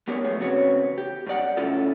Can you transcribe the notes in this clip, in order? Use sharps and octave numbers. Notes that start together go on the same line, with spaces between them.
F#3 B3 G4 G#4 A#4 C#5
F3 A3 B3 G#4
E2 C#3 C4 F#4 B4 C#5
G4
F#2 F#3 D5 F#5
A2 C#3 C#4 E4 F4 A4